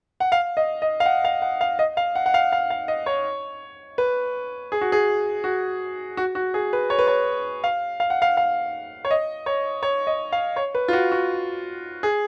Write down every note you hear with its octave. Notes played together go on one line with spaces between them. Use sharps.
F#5
F5
D#5
D#5
F5
F#5
F5
F#5
F5
D#5
F5
F#5
F#5
F5
F5
F5
D#5
C#5
B4
G#4
F#4
G#4
F#4
F#4
F#4
G#4
B4
C#5
B4
C#5
F5
F5
F#5
F5
F5
C#5
D#5
C#5
C#5
D#5
F5
C#5
B4
F4
F#4
F#4
G#4